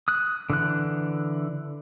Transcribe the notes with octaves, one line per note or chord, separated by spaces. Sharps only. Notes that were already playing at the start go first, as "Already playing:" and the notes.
D#6 F#6
D3 E3 F#6